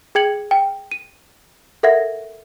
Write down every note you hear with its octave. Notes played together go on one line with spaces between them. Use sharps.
G#4 G5 G#6 C#7 F#7
G5
D#7
A4 A#4 E5 F#5 G#6 A#6